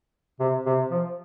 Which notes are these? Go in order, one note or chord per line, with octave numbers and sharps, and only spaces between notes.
C3
C3
F3